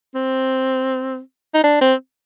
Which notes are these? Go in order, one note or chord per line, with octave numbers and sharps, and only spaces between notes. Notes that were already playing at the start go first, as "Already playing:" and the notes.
C4
D#4
D4
C4